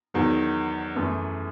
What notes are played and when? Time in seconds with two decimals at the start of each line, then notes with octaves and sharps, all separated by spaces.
0.14 E2 D#3 F#3
0.96 F#2 E3 A3